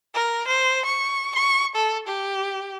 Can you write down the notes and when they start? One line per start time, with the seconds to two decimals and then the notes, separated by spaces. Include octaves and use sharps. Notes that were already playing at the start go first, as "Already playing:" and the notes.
0.14 A#4
0.47 C5
0.85 C#6
1.35 C#6
1.75 A4
2.07 G4